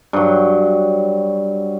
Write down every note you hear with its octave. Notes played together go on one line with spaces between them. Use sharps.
G2 F#3